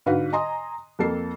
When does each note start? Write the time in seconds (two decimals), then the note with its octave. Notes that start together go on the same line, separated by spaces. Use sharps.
0.06 G#2 D3 F#4 B4 F5
0.32 D#5 G#5 A#5 C6 D#6
0.99 F2 A#3 A4 C7